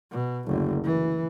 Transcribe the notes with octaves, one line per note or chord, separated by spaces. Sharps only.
B2
F#1 D2
E3